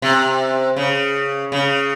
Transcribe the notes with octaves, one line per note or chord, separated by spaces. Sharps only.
C3
C#3
C#3